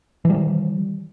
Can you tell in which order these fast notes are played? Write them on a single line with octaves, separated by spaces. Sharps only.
E3 G3 D#3